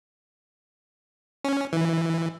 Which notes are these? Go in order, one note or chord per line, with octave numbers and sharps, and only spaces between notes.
C#4
E3